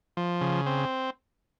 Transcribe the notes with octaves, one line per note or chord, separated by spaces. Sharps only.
F3
C#3
C4